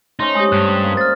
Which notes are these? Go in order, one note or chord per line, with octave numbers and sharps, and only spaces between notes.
A3 C#4 D#4 C5 C6
G#3 G4 C6 D#6
G2 F#6
A#3 D#5
C5 D5 F6 A6